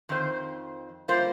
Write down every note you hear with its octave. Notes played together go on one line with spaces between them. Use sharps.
F2 D#3 C5
G3 A#3 F4 C5